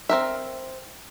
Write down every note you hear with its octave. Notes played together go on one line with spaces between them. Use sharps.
C4 A#4 E5